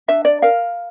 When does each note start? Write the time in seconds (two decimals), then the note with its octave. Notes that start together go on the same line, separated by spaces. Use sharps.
0.08 D4 E5
0.25 D5
0.42 A#4 F5